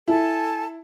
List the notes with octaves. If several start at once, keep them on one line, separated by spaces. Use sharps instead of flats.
E4 A4 G#5 A5